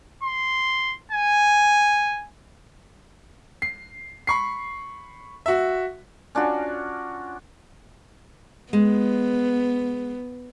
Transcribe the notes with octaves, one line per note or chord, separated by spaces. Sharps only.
C6
G#5
C7
B5 C#6 C7
F#4 E5
C#4 D4 F4 F#4
G#3 B3